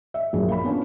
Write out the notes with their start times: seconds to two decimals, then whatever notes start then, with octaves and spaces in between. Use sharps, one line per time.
0.14 E5
0.33 A#1 F#2 G#4
0.49 F5 B5
0.64 B3 C#4 D4 F4